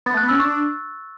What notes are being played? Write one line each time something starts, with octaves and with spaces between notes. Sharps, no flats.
B3 A6
A3
F#6
B3
C#4 E6
D4 C#6